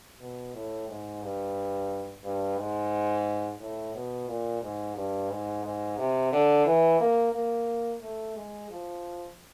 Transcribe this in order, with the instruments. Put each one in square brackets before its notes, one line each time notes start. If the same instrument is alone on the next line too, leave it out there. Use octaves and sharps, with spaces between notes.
[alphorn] B2
A2
G#2
G2
G2
G#2
A2
B2
A#2
G#2
G2
G#2
G#2
C3
D3
E3
A#3
A#3
A3
G#3
F3